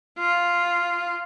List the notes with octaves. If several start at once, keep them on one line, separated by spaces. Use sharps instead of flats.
F4